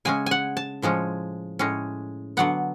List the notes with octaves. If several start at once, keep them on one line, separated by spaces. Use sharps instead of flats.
C#3 G#3 C#4 G#5
F#5 G#5
A5
A2 F3 G#3 C#4
A2 G#3 C#4
D3 F#3 B3 F#5